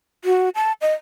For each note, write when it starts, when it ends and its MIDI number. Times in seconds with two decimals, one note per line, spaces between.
0.25 0.49 66
0.55 0.72 81
0.82 0.93 75